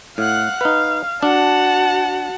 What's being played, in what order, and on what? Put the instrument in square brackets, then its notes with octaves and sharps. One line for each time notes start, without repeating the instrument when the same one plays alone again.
[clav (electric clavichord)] A2 [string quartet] F5 F#5 F#6
[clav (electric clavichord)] D#4 B4 [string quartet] F5
[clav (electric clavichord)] D4 [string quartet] F#4 F#5 A5